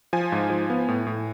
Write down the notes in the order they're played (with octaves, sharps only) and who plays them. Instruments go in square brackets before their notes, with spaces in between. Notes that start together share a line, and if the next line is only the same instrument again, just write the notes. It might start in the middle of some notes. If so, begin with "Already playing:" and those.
[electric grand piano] F3 G#5
G#2
F3
B3
A2
A2